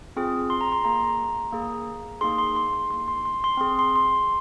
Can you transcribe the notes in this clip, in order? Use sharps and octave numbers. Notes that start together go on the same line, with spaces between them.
C4 F4 G#4
C6
A#5
C6
A#3 G#4 A#5
A#3 G#4
A#3 D#4 G#4 C6
C6
C6
C6
A#3 D#4 G#4 C6
C6
C6
C6
C4 G#4 C6
C6
C6